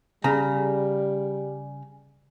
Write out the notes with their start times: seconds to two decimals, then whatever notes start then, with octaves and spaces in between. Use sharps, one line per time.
0.24 C#3 G3 A#5